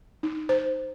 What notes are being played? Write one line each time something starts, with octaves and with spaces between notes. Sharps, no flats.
D#4
C5